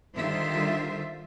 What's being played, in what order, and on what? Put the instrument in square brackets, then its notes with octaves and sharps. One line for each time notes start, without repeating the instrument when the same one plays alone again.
[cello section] D3 D#3 G3 F4 C5 E5